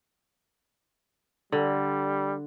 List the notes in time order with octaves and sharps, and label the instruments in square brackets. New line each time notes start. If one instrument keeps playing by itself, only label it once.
[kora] D3 [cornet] G3